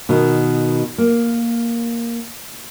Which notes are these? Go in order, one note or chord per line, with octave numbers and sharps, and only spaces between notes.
B2 D#3
A#3